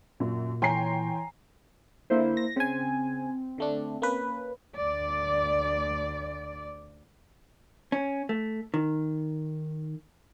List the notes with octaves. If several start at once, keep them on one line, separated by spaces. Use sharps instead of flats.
F#2 A#2
E3 C#5 G5 G#5 A#5 C6 C7
D3 A#3 E4 C5
A#6
C#3 C4 G#5
D3 A3 D4
A#3 C#4 B4
D2 D5
C#4
A3
D#3